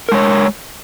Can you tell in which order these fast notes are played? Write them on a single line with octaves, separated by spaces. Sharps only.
A#4 G#3 C#5